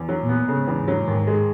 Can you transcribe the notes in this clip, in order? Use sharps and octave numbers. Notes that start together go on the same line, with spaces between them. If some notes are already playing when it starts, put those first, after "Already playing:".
Already playing: E2
F#3
A#2
B3
G#2 C#3
E2
F#3
D#2 G#2
G#3